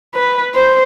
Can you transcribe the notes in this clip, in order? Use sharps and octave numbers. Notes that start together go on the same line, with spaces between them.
B4
C5